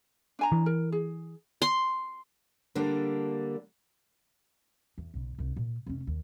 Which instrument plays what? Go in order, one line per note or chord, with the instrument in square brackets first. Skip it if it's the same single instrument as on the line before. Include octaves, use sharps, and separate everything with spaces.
[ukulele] D4 G#5 A#5
[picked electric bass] E3
[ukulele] A#4
G#4
[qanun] C6
[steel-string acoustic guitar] D3 G3 A#3 D4
[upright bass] E2
B1 C#3
C2 D#4
A#2
F1 C#4
D#2